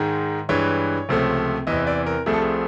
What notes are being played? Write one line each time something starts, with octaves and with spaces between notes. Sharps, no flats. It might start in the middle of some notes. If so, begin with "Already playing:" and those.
Already playing: G#2 D#3 G#3
G2 E3 G#3 C#5
C#2 C3 F3 A3
E2 C3 E3 D#5
D5
A#4
C2 C3 F3 A3 G#4
A4
G#4